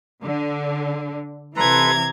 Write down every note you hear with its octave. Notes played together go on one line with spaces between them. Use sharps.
D3
C3 E3 A4 B4 A#5 C6 G#6